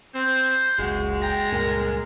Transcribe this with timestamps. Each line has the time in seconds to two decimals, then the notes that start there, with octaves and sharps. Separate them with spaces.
0.15 C4 C5
0.79 F#1 C#2 G#3 F#4
1.22 G5 A#5
1.52 C#2 G2 A#2 A#4